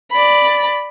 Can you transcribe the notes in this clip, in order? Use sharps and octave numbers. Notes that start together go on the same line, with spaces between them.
D5 B5